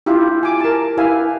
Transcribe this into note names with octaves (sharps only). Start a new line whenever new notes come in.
E4 F4 G4
G#5 D6
A#4 A5
E4 G4 B4 E5 F5 G#5